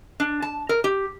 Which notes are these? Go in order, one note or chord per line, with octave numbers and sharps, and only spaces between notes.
D4
A5
A#4
G4